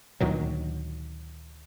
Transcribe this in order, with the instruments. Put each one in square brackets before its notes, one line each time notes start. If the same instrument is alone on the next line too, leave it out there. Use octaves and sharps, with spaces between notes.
[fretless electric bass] D2 A#2 D#3 F#3